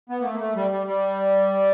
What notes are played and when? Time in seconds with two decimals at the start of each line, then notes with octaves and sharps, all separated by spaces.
0.10 B3
0.21 A#3
0.25 A3
0.35 A#3
0.40 A3
0.55 G3
0.71 G3
0.87 G3